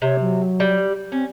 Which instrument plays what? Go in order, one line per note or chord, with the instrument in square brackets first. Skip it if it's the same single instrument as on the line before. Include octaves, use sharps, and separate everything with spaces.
[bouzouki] C3 [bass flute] C#5
[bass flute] F#3
[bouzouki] G3
[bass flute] C4 [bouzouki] C#4